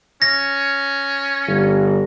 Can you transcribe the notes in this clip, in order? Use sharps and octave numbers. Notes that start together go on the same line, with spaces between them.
C#4 A#6
G1